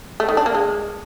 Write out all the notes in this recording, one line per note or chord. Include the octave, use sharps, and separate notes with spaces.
A3
D#3
D4
A#3
G#3